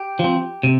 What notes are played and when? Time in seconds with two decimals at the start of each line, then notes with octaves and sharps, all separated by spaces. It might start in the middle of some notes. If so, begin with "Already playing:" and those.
Already playing: G4
0.19 F3
0.24 C4
0.63 C3